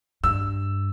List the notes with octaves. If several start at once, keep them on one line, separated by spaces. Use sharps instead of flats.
G2 E6